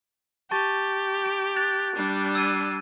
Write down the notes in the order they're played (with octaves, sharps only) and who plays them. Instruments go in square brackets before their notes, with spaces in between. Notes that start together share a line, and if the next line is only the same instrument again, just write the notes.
[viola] G4 [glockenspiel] A5 C#6 A6
[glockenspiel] D7
F#6 A6 F7
[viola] G3 D4
[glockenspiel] E6 G#6 D#7